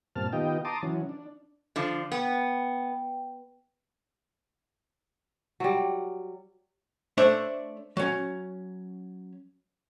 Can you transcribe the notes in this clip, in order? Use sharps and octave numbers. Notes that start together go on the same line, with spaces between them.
G2 A#2 C4 A5 F6
D#3 B3 F4 G4 D#5 G5
A5 A#5 C6 D6 D#6
E3 F#3 C#4
D4
D3 F3
B3 G5
F#3 G3
A3 D4 C5 C#5 E5
F#3 C#4